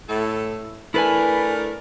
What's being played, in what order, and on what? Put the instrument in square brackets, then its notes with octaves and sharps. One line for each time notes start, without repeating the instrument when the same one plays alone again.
[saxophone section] A2 A4
[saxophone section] A3 D4 A#4 [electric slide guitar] E4 B4 G#5